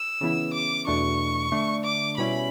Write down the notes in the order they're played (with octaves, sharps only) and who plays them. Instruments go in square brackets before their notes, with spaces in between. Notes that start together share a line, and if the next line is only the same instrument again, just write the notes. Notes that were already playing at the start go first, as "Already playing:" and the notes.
Already playing: [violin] E6
[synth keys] C#3 E3 B3 E4
[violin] D6
[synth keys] E2 B2 A3 D4 [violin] C#6
[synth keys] D3 A3 D4
[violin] D6
[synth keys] B2 G3 C#4 E4 [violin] B5